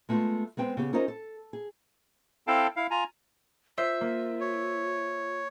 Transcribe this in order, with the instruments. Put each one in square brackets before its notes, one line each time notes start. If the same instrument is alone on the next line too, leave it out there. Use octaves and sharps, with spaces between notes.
[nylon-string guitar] G#3 A3 B3 F4
G#3 B3 C4 G5
C#3 B3 G4
C#4 D#4 F4 A#4 C5 D#5
A4
G#4
[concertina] C4 E4 A4 F5 G5 A5
E4 F5
F4 G#5 A#5
[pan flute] F4 [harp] C5 [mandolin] E5
[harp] A#3
[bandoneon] C#5